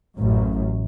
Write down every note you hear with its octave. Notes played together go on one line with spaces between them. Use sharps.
A1 F#2